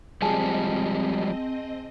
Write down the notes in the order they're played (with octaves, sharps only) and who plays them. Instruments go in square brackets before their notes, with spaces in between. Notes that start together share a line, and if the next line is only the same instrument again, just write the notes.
[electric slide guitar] F3 G3 G#3 [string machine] C4 D#5 [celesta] G#4 G#5 A5